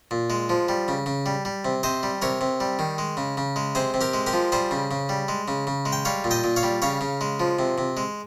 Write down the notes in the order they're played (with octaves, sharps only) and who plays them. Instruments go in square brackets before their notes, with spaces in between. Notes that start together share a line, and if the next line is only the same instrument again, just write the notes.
[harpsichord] A#2
G#3
F3
G3
C#3
C#3
G3
G3
C3
C3 C5 D#5
G3
C3 A#4 C#5
C3
G3
D#3
G#3
C#3
C#3
G#3
C3 G#4 C5
C3
G4 A#4
G#3
G4 A#4
F3
G3 G#4 C5
C#3
C#3
G3
G#3
C#3
C#3
G#3
G5
G3 C#5 F5
A#2
D#5 G5
A#2
C#5 F5
G3
C#3 C#5 F5
C#3
G#3
F3
C3
C3
G#3